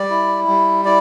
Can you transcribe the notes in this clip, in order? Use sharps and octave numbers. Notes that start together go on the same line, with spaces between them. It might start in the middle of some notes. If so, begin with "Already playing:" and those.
Already playing: G3 D5
E4
G3
E4 D5